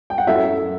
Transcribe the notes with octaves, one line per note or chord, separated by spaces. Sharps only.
G5
F#5
F#2 F#3 A3 E4 E5